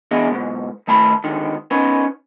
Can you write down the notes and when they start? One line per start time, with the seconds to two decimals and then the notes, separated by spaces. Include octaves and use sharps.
0.11 E3 B3 D4 G#4 D#5 E5
0.30 D#2 G#2 B2
0.87 D#3 A3 A5 B5
1.24 G#2 D3 D#3
1.71 B3 C#4 D#4 B4